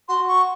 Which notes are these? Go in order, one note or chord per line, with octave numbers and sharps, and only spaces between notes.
F#4 C6
C#6